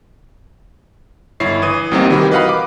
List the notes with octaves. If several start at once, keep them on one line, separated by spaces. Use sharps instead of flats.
G1 E4 C#5 C7
E3 D#6 D#7
C2 C3 G3 A#3 C4 D#4
D#3 E3 G3 F#4 G4 A#4
B4 D#5 F5 F#5 B5
D6